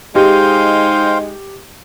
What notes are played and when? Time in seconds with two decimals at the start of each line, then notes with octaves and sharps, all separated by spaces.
0.15 G#3 D#4 G4 C5 F5 G5